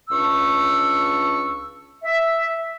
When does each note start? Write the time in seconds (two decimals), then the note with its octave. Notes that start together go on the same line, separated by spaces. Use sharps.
0.11 C#2 D4 C#6 E6
2.04 E5